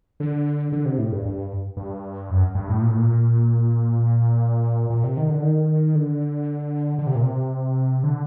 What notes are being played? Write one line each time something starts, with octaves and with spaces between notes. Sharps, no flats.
D3
D3
C3
A2
G2
G2
G2
F#2
G2
A2
A#2
A2
A#2
A#2
C3
D#3
D3
D#3
D3
D3
C3
A#2
C3
D3